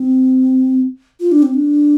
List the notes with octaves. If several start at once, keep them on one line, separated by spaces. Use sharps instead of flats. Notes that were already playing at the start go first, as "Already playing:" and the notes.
Already playing: C4
F4
D4
C4
D4